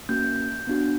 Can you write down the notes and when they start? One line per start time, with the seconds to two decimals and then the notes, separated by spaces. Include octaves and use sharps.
0.09 A#3 C#4 F#4 G6
0.67 B3 D4 F#4